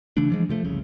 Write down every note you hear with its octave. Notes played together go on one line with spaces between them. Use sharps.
C#3 E3 A3 D4
E3 F3 G#3
C3 F3 A3
F#1 C2 C#3